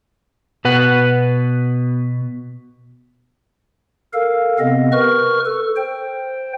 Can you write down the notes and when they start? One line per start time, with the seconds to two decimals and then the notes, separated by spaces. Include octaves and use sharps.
0.65 B2 B4 F#5
4.13 A4 A#4 F5
4.59 C3 B3 C4 D#5
4.92 A#4 B4 C#6 F6
5.45 A4
5.76 C5 G5